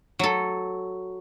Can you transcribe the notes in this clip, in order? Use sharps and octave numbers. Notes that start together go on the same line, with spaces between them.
F#3 A4